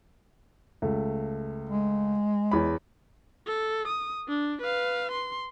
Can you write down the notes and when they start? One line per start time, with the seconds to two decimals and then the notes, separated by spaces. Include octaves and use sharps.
0.82 C#2 A3
1.69 G#3
2.51 E2 C#5 B5
3.47 A4
3.88 D#6
4.29 D4
4.62 B4 F5
5.11 C6